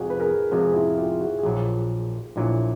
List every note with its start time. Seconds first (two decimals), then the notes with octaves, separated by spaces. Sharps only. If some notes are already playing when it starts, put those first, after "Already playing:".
Already playing: F2 C3 F3 G#3 F#4 G#4
0.10 B4
0.20 G#4 A#4
0.51 F2 C3 F3 G#3 F#4 G#4
0.74 E4 F#4
0.97 F4 G4
1.21 F#4 G#4
1.39 G#4
1.43 A#1 A#2 F#3 F4 G4
2.36 A#1 A#2 F#3 D4 E4